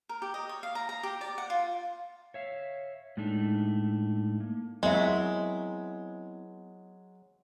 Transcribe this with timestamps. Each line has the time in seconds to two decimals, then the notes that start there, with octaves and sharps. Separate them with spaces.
0.09 A#4
0.22 G4
0.34 D#5
0.49 C#5
0.63 F5
0.75 A#5
0.89 A#5
1.03 G4
1.21 D5
1.38 F#5
1.50 F4
2.34 C#5 E5 F5
3.17 A2 G#3 A3 D4 D#4 E5
4.40 A#3
4.83 F#3 G#3 B3 C4 E4 A#4 E5